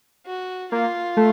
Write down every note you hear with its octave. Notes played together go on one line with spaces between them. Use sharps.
F#4
A#3 F4
A3